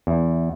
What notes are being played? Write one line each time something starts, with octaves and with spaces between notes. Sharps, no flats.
E2